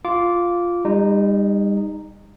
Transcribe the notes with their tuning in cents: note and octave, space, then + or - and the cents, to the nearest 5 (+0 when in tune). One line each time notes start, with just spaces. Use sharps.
F4 +0 D6 -15
G3 +35 D#4 -10